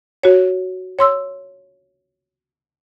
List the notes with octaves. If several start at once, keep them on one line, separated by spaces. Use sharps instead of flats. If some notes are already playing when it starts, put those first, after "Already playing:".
F#4 C#5
C#5 C6 E6